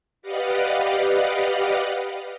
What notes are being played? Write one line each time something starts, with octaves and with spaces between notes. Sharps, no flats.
G4 B4 D5 D#5 F5 F#5